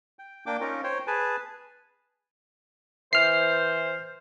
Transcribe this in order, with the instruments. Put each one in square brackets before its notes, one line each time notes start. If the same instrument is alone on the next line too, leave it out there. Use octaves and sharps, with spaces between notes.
[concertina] G5
A#3 D4 G5 D6
C#4 D#4 F4 A#4
C5 C#5 G5
G#4 B4 G#5 A5
[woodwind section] E3 C5 [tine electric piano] F6 C7